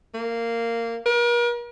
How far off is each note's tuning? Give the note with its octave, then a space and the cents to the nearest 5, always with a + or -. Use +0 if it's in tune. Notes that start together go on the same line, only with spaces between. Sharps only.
A#3 -15
A#4 +40